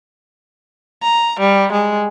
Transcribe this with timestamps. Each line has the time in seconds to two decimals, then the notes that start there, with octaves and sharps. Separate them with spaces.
1.02 A#5
1.39 G3
1.72 G#3